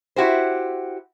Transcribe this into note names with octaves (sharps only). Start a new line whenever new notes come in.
E4 F#4 G4 C5